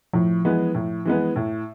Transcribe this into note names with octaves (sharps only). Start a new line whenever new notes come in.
A2 F3
E3 G#3 B3
A2
E3 G#3 B3
A2